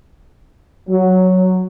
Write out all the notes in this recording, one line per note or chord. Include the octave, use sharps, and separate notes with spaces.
F#3